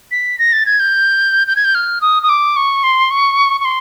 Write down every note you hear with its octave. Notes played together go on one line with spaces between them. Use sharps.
B6
A#6
A6
G#6
G6
G6
G#6
G6
F6
D#6
D#6
D6
C#6
C6
C#6
C#6
C6